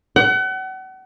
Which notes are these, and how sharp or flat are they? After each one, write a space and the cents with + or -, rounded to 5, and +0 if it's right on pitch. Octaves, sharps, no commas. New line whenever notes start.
F#5 +35